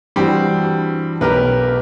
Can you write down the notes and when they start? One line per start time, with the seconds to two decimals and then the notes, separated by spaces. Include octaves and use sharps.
0.16 G2 E3 G3 C4 F#4
1.21 B1 G4 A#4 B4